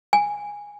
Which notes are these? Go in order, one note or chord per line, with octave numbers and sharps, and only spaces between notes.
G#5